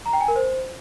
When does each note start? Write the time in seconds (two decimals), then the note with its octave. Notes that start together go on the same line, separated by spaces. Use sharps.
0.06 A#5
0.13 G5
0.21 G#5
0.28 A#4
0.36 C5